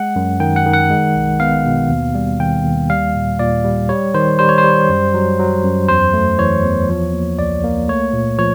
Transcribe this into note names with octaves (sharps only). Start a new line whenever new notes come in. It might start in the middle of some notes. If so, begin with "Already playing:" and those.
Already playing: G#3 F#5
F#2
D#3 G5
F#5
D#3
F#5
G#3
B1
B3 F5
B2
D#2
G3
D#3 G5
D#2
G3 F5
A#2
A#2 D5
G3
G3 C#5
D#3 C5
G3 C5
C#5
C5
G3
F#2
F#3
F#3
F#2
E2 C5
A3
E3 C#5
E2
F3
A#3
C#2 D5
A#3
A3 C#5
A#2
F3 C#5